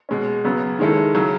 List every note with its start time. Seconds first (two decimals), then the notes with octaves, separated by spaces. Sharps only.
0.09 B2 G#3 C#4
0.44 C#3 F#3 B3
0.79 D#3 G#3 C#4 E4 A4
1.15 C#3 F#3 C#4